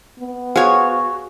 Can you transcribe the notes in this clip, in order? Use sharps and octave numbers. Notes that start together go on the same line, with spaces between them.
B3
F#4 G#4 C5 C#5 F5 F#5